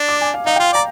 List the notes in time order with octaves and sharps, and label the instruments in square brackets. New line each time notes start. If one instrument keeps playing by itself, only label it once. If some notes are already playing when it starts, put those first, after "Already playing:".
Already playing: [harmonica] D4
[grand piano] D6
G#5
F5
[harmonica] D#4 [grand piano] F5
[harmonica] F4 [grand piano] G5
[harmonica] D5 [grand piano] A#5